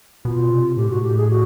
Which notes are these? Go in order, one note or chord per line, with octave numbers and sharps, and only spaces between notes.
B2 F4
C3
A2 G4
G#2 F#4
A2
G4
G#4
F#4